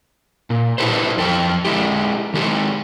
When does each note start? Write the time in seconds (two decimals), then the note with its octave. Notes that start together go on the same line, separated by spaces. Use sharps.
0.50 A#2
0.78 E4 G4 A4 B4 C5
1.17 F2 A4 G5
1.65 G#3 E4 G4
2.34 D#3 G#3 G4 A4